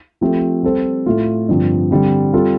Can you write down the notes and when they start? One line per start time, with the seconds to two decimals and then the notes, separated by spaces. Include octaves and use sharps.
0.21 F3 A3 C4 G4
0.63 G3 C4 A4 C5
1.06 A2 A3 F4
1.49 G2 D3 F3 C4
1.91 D3 G3 C4
2.33 G3 C4 F4 A4